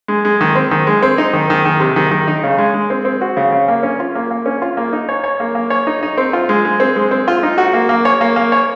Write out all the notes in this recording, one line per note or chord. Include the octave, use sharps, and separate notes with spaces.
G#3
G#3
D#3
C4
D#3
G#3
C4
D#4
D#3
D#3
D#3
C3
D#3
D#3
D#4
C#3
G#3
G#3
C4
C4
F#4
C#3
C#3
A#3
C#4
F4
A#3
A#3
C#4
F4
A#3
D#4
C#5
C#5
A#3
A#3
C#5
D#4
D#4
C4
F4
G#3
G#3
C4
G#3
C4
F4
D#4
F#4
A#3
A#3
C#5
A#3
A#3
C#5